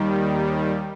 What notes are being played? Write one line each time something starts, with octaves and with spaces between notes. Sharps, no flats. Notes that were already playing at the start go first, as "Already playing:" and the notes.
Already playing: D#2 D#3 G3